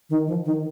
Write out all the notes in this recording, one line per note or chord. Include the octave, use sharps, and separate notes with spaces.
D#3
F3
D#3